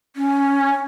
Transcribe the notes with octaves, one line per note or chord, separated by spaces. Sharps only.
C#4